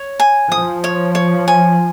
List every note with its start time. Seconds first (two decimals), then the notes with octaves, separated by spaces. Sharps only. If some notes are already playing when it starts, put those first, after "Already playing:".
Already playing: C#5
0.20 G#5
0.51 F3 D#6
0.84 C#5
1.15 C#5
1.48 G#5